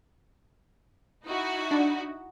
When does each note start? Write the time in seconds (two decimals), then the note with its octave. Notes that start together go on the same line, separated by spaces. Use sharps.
1.26 D#4 E4 F#4
1.71 D4